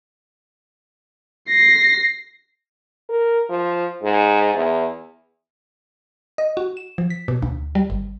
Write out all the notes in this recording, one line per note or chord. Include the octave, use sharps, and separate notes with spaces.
A#6 C7
A#4
F3
G#2
E2
D#5
F#4
E7
F3
B6
B2
D2
G3
G1